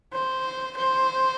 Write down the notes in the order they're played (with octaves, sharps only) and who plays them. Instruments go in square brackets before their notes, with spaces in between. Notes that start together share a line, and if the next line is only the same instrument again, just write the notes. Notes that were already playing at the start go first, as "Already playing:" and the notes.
[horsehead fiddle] C5
C5